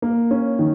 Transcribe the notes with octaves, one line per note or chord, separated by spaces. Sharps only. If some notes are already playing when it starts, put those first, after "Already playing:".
A#3
C#4
D#3